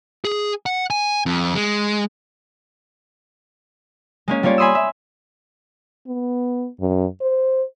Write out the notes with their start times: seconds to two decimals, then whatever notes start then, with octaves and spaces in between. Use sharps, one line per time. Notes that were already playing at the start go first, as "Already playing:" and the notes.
0.25 G#4
0.66 F#5
0.90 G#5
1.26 F2
1.55 G#3
4.28 G#3 A#3 C#4
4.43 G3 A#3 F4 C#5 D5
4.58 G#5 B5 C6 D#6 E6
4.75 E5
6.07 B3
6.81 F#2
7.21 C5